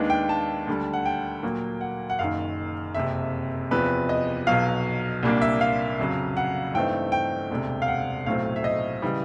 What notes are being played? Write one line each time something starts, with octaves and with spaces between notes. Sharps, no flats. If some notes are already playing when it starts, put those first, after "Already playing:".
Already playing: D#2 D#3 G#3 B3 D4
G5
A5
D2 D3 G3
F#5
G5
A#2 F#3 A#3
F#5
F#5
F#1 F#2 D#3 F5
F#1 F2 C3 E5
E2 C3 F3 B4
D#5
B1 B2 F#3 F5
C2 A#2 G3 A#3 D4
E5
F5
F2 C#3 F#3
F#5
G2 E3 A3 C4 D#4 G5
G5
E1 D2 C3
F5
F#5
B1 A2 F#3 A3 C4 F5
E5
D#5
C#3 E3 G3